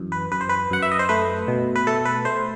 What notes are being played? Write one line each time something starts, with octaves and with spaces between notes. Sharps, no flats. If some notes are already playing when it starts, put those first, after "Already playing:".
Already playing: F#2 E3
B4
F#2 B4
C5
B4
F#2 F#5
E5
D#5
C5
A3 B4
B2
B4
A3 A4
B4
A3 C5